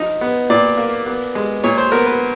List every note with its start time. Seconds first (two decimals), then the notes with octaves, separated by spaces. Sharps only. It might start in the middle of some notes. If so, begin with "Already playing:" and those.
Already playing: F3 D#4
0.21 B3
0.50 A#2 D5
0.77 A#3
1.06 B3
1.35 G#3
1.64 A#2 C#5
1.78 C5
1.92 B3 A#4
2.06 B4